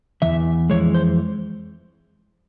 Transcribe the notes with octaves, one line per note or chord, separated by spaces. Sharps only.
E2 E3 E5
F2 C#3 E3 G#3 C#5
C5